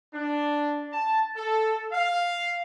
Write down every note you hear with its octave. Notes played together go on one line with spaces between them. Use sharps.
D4
A5
A4
F5